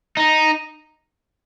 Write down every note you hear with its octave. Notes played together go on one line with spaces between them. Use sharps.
D#4